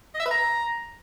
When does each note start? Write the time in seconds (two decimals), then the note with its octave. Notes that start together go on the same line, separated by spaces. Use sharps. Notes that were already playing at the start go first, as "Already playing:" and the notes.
0.14 D#5
0.20 E5
0.25 B4
0.31 A#5